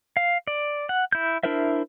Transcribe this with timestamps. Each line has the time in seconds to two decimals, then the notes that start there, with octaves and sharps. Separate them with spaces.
0.17 F5
0.47 D5
0.89 F#5
1.12 E4 G6
1.43 D4 E4 A#4 C5 E5